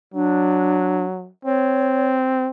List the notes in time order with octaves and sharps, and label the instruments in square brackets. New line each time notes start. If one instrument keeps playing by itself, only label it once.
[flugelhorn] F#3 [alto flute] D4
[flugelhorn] C4 [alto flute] C#5